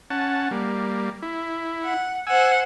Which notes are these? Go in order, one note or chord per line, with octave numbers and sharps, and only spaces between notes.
C#4 F#5 A5
G3 A#3
E4
F#5
C5 F#5 G#5 E6